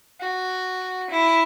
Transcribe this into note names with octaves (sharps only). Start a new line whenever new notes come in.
F#4
E4